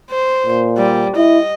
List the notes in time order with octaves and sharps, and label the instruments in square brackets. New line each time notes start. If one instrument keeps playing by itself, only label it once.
[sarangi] C5
[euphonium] A#2
[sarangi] G3
[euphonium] E4 [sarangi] D#5